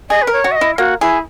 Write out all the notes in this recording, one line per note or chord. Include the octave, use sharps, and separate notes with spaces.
G#4 D#5
B4
A#4
C#5
F#4
E5
D#5
E4
A#3 F#4
E4 G#4